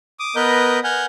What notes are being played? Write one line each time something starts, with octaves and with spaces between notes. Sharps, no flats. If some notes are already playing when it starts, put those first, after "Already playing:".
D6 D#6
B3 A#4 B4 D#5 G6
F#5 G#5 F6 G6